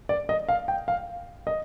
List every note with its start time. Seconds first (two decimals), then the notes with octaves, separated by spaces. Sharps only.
0.09 D5
0.29 D#5
0.49 F5
0.68 G5
0.88 F5
1.47 D#5